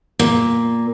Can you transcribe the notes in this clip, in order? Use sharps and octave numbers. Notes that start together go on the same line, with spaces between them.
A#2